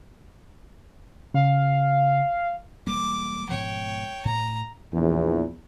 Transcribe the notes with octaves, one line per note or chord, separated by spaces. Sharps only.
C#3 F5
E1 G3 A#3 D6
G#2 B2 F3 C#5 G5
A2 A#5
A#1 E2